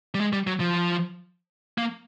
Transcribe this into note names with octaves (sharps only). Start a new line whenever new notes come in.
G3
G#3
G3
F#3
F3
A#3